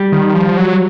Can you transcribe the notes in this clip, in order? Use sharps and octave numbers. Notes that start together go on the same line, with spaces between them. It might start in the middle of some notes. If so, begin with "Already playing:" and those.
Already playing: G3
D#3
F3
F#3